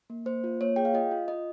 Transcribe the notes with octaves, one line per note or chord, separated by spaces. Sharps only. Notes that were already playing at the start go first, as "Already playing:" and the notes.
A#3
A#3 C5
F4
A#3 C#5
G#4 G5
F5
F4 D#5
F4
F4 D#5